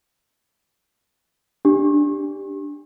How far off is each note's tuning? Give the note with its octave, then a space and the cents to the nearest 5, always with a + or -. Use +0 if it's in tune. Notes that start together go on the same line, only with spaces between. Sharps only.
D4 +0 G4 +0